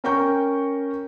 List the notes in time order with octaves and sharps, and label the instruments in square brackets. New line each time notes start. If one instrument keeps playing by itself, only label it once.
[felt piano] C#4 A#4 G5 A#5 C#6 G6